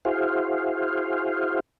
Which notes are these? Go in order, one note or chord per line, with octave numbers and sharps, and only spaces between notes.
E4 F#4 G#4 C5 F5